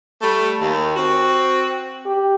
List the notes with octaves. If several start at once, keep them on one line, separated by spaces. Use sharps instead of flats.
G3 A3
D#2
C4 F#4
G4